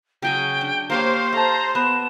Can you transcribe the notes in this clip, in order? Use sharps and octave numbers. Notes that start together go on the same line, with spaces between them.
C#3 F#3 G5 G#5
D4
A#3 G4 C5 C#5 F5
A4 F5 A5 A#5
B3 B4 E7